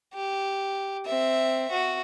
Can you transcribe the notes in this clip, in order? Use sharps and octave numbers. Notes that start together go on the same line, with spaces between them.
G4
C4 E5
F#4